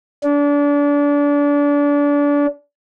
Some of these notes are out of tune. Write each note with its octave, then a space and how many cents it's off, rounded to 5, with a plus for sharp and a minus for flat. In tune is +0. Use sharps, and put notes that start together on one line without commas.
D4 -30